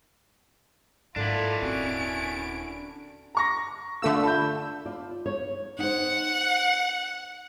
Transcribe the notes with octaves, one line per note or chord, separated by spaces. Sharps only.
G#2 D3 A#3 D4 E4 F4 A4 A#4
D#1 C4 C#4 F#4 D7
A#5 C#6 A#6
D3 A3 F4 E6
A5 B5 G6
F4 D5
C#5
D#4 C5 F#5